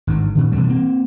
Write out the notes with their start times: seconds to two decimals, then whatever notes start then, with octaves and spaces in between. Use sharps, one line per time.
0.07 G#1 G2
0.35 A#2 D#3
0.52 G2 B2 E3 G3
0.69 A#3 C4